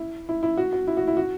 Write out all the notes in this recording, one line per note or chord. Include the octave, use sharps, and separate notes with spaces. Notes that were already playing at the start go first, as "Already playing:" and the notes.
Already playing: E4
E4
E4
F#4
F#4
E4
F#4
E4
F#4